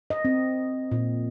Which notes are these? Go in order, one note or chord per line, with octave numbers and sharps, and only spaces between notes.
D#5
C4
A#2